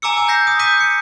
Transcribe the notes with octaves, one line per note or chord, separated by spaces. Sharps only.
G#5 A#5 D6 E6 C#7
G#5 D6
G6 A#6 C7
D#6
D6 G6 B6 D#7
C#7